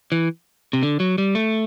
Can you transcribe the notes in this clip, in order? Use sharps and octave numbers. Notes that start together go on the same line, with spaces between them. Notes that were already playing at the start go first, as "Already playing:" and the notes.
E3
C3
D3
F#3
G3
A3